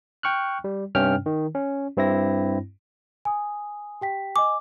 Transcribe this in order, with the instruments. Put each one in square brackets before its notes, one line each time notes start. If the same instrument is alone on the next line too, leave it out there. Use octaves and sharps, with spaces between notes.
[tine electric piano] G5 C#6 F6 F#6
G3
G2 C3 C#4 G5 F6
D#3
C#4
G2 C4 E4 A#6
[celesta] G#5 D#6
G4 G5 B6
[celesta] D#5 G#5 [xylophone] D6